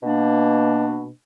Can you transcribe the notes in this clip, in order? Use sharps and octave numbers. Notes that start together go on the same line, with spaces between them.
B2 A#3 D4